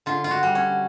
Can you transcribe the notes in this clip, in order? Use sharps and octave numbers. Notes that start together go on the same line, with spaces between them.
D3 F4
F4
F#4
G3
C#4